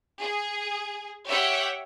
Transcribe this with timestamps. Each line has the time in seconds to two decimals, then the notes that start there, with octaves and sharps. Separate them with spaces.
0.21 G#4
1.27 G4 C#5 E5 F#5 G5